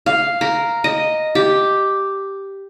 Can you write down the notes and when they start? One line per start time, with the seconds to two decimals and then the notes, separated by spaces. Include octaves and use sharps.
0.06 F5
0.41 A#4
0.84 D#5
1.35 G4